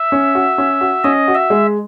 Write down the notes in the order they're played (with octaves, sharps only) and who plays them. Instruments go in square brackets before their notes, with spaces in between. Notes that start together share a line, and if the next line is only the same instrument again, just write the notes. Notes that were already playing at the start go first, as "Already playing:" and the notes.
Already playing: [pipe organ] E5
[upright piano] C#4
F#4
C#4
F#4
[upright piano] C#4 [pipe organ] D#5
[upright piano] F#4
[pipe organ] E5
[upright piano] G#3